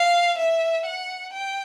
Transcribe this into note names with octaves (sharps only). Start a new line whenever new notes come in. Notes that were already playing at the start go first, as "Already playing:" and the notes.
Already playing: F5
E5
F#5
G5